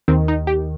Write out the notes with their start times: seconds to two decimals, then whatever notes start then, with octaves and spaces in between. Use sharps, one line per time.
0.08 D#2 D#3 C4
0.28 D#4
0.47 G4